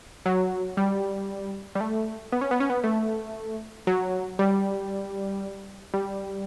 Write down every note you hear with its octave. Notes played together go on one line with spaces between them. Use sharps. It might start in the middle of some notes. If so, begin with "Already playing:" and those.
F#3
G3
G3
A3
B3
C#4
B3
C#4
B3
A3
F#3
G3
G3